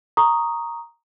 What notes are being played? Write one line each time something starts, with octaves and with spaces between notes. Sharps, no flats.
A#5 C#6 D#6